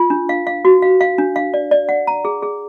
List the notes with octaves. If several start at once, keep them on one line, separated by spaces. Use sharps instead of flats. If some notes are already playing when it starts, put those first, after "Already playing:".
Already playing: F4
D4
F5
F5
F#4
F5
F5
D4
F5
D5
D5
F#5
A#5
G#4
G#4